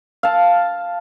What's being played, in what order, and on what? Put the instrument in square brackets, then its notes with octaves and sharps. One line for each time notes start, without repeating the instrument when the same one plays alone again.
[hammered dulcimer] F5 A5